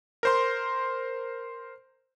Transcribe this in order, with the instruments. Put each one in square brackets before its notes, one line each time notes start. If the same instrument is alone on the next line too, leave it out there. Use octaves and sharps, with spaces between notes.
[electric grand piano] A#4 C5 C6